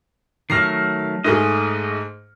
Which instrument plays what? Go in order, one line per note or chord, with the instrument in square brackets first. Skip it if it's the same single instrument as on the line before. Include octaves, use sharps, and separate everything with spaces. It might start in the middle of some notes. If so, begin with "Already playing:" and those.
[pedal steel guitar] D#3 F#3 A3 [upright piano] F6 A#6 C7
[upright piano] G#2 A3 G#4 [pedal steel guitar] D#5